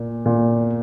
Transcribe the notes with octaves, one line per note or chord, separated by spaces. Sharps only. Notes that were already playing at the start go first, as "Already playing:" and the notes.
Already playing: A#2
A#2